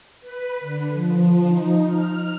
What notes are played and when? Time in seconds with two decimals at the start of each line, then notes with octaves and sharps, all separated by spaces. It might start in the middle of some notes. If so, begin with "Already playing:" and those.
0.20 B4
0.60 D3
0.92 F3
1.47 D#4
1.86 F6